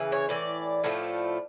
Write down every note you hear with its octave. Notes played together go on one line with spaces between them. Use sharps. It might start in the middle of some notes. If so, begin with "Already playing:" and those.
Already playing: C#3 E3
C#5
A2 E3 D5
A2 F3 A3